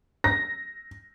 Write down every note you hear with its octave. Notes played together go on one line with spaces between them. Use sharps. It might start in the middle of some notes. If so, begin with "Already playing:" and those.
A#6